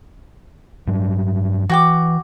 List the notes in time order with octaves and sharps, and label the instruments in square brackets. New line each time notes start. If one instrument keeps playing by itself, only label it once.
[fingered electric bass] G2 F#3 D4
[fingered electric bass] E3 [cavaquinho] F#4 G5 D6